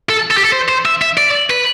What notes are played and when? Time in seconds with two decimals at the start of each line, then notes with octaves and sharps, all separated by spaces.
0.09 A4
0.31 A4
0.37 G4
0.45 A4
0.52 C5
0.69 C5
0.85 E5
1.02 E5
1.18 D5
1.50 B4